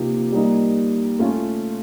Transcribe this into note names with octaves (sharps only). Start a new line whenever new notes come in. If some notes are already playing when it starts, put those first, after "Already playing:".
Already playing: C3 F3 A#3 D#4 G4
G3 A#3 D#4
A3 C#4 F4